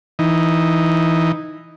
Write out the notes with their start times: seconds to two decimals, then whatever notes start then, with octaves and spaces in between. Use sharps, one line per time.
0.19 E3 D#4